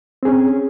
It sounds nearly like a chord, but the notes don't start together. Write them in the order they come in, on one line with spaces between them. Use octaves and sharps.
C4 G#4 C#4